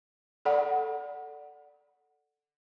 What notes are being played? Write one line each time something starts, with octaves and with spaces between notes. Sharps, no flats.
A4 D5 F#5